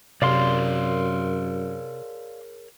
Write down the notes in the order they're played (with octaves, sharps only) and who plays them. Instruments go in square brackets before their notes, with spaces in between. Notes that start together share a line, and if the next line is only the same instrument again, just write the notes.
[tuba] F#2 [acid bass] C3 [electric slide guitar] G#4 A#4 C#5 [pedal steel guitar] D5 F5 C6